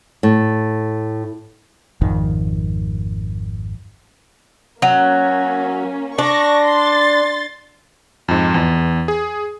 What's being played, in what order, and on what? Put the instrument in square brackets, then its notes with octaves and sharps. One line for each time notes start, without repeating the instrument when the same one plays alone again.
[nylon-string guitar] A2
[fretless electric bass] G#1 F2 D#3
[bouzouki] F#3 [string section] A#3 C#4
[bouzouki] D4 [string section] C#6 A#6
[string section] C6 A6
[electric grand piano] F2 G#2
E2
G#4